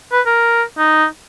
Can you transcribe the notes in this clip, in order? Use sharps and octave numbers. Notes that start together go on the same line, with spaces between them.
B4
A#4
D#4